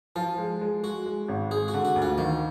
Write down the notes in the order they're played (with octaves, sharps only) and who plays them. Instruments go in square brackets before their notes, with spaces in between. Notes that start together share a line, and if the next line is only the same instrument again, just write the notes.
[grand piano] F3 [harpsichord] F4
[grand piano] G#3
G#3
[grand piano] G#3 [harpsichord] F#4
[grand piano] G#3
G#1
[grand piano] G#3 [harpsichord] G#4
[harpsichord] F#4
[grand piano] D3
[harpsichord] F#4
[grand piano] D2
[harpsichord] F4
[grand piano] D#3 [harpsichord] A#3